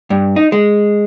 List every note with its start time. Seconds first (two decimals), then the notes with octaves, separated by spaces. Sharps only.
0.10 G2
0.36 D#4
0.52 G#3